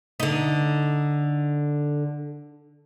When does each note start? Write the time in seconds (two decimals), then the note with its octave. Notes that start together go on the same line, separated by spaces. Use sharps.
0.20 D3 D#4